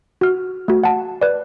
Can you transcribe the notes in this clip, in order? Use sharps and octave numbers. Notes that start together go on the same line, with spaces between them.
F#4 F6
A3 F#4
F#5 A5
B4 D5